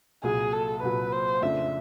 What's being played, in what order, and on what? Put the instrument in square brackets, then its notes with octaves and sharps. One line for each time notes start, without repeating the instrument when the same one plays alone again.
[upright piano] C2 A#2 F#3 [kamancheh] G#4
[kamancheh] A4
[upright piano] C2 A#2 F#3 [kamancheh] B4
[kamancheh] C5
[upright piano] F2 C#3 F3 A3 D4 [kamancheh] E5